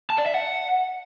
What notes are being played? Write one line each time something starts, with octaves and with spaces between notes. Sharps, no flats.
A5
D5
E5
F#5